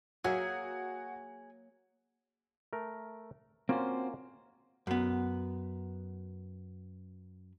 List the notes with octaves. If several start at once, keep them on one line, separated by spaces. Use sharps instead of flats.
F#3 A#3 F#4 G#4 E5
A3 A#4
A#3 C4 C#4 F4 F#4 C5
F#2 B3